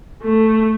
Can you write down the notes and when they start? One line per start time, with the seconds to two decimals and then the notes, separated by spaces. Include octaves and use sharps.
0.22 A3